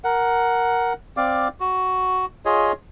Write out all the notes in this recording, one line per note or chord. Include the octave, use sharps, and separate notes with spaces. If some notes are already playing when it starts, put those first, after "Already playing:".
A#4 F#5
C4 D5 F5 D6
F#4
F4 G#4 C#5 D#5